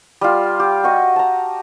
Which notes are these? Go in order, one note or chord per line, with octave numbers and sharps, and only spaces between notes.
G3 F4
G4
F#4 G4 D#5 C#6
A5 A#5